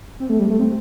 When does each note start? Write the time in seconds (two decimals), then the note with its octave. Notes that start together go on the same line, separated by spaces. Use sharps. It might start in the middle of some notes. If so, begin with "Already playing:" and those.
0.20 C4
0.29 A3
0.39 G3
0.50 A3
0.59 C4